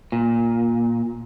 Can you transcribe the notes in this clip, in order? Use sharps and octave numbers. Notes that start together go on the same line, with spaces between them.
A#2